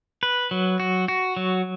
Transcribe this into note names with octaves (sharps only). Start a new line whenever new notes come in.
B4
F#3
F#4
F#4
F#3